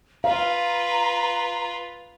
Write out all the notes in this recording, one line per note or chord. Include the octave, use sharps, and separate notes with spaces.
F4 B4 F5 A#5